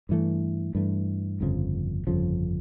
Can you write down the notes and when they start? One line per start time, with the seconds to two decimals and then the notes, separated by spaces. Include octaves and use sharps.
0.09 G2 E3 A3
0.75 G2 E3 A3
1.41 G1 F2 C#3 F3
2.07 G1 F2 C#3 F3